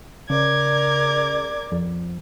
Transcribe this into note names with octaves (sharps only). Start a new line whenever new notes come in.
C#3 A#4 D5 D6 G#6
F2